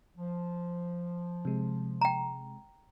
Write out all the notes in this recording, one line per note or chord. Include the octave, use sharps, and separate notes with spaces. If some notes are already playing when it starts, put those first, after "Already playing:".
F3
C3 G#3
G5 A#5